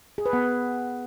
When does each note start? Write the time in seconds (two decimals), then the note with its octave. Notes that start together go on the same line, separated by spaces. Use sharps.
0.18 G#4
0.26 B4
0.33 B3